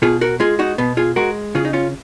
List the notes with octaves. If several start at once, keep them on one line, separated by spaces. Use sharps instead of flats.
B2 F4 G#4
F#4 A#4
G#3 F4 G#4
D#4 F#4
B2 B3
F4 G#4
G#3 F#4 A#4
C#3 F4 G#4
D#4
C#4 F4